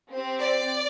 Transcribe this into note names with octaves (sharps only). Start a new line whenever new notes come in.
C4 G4
D5